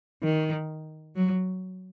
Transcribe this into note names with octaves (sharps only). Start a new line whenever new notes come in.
D#3
F#3